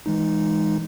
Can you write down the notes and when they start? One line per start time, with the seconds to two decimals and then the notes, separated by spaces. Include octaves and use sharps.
0.06 E3 G#3 D#4